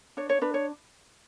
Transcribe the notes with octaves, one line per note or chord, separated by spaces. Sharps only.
D4 C#5
C#5
D4 B4
C#5